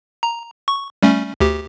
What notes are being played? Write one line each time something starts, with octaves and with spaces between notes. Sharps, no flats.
A#5
C#6
G3 A3 C#4
D2 G4